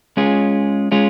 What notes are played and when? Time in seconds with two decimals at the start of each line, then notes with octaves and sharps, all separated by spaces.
0.17 G#3 C#4 F4 G#4
0.92 G#3 C#4 F4 G#4